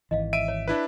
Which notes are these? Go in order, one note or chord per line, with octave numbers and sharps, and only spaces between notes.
G#1 E3 D#5 F5
E5 D7 D#7
C#5
D4 E4 B4